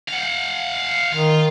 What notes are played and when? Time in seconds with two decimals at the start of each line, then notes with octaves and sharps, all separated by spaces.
0.08 F5 F#5
1.13 D#3 F4